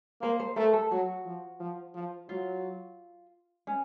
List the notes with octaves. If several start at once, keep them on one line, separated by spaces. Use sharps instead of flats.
A#3 C5
C5
A3 A#4
A4
F#3 F#4
F3
F3
F3
F#3 F4
C#4